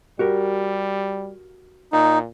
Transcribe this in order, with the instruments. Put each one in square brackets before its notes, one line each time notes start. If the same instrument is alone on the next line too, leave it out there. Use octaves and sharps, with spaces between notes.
[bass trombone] G3 [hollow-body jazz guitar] F#4 G4 A#4
[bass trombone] A#2 [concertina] D#4